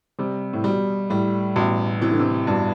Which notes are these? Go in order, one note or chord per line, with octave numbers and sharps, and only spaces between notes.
C3 G3
A2
B2 G3
A2 G3
A1 B2
C3 E3
D3
C3
G2 B2